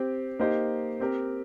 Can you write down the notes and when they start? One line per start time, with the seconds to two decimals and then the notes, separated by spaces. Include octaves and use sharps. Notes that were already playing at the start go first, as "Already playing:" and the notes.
Already playing: C4 G4 C5
0.40 A#3 D#4 G4 C5 D#5
1.00 C4 G4 A#4